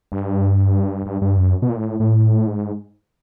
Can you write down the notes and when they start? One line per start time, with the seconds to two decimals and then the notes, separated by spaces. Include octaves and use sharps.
0.12 G2
1.06 G2
1.22 G2
1.37 F#2
1.62 B2
1.69 A#2
1.76 A2
2.00 A2
2.47 G#2